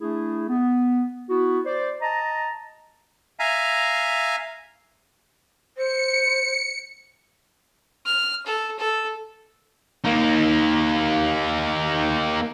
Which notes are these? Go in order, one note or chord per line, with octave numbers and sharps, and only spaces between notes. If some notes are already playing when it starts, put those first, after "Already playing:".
A3 D4 E4 G#4
B3
B3 E4 F#4
C5 D5
D#5 A5 A#5
E5 F5 G#5 A#5
C5 C#7
F6
A4
A4
A#3 D#4